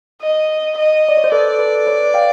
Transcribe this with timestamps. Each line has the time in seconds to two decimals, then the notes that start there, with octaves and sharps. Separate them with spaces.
0.22 D#5
0.77 D#5
1.09 D5
1.17 C#5
1.24 C5
1.32 A4 B4 D5
1.59 A4 B4
1.87 B4 C#5
2.14 F5 G5